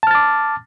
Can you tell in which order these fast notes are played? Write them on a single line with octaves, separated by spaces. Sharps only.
A5 F6 A6 D6